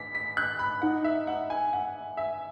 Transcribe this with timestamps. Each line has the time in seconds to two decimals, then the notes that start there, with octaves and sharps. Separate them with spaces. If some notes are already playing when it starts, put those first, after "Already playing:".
Already playing: B6
0.15 B6
0.37 F#6
0.59 B5
0.82 D#4 F#5
1.04 E5
1.27 F#5
1.50 G#5
1.73 F#5
2.17 E5